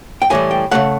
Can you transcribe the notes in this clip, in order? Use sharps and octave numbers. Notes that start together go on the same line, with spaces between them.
G5
A2 E3 G3 G#5
G5
C#3 F#3 A3 F#5